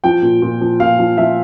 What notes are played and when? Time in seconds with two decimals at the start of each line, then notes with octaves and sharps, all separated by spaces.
0.04 F3 G5
0.22 A#2
0.42 A#2
0.61 F3
0.80 A#2 F5
0.99 F3
1.17 F3 E5